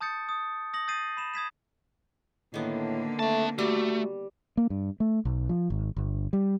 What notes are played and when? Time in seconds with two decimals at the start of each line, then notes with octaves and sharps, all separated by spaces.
0.01 A5 D#6 G6 A6 C#7
0.29 D#6
0.74 D#6 A#6 F#7
0.88 D#6 G6 A6 C7 D#7
1.17 B5 E7
1.34 D#6 G#6 B6 E7
2.54 A2 D3 D#3 A#3 B3
3.19 A3 C4 A5
3.58 G3 A3 F#4
4.57 A#3
4.70 G2
5.00 A3
5.25 B1
5.49 F3
5.70 G#1
5.97 G1
6.33 G3